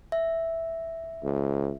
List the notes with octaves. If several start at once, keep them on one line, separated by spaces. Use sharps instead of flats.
E5
C#2